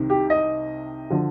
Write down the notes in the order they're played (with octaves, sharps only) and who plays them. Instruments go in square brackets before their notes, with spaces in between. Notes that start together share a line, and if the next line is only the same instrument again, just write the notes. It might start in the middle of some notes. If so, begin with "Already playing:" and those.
Already playing: [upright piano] C2 C3 D#3
G4
D#5
D3 F3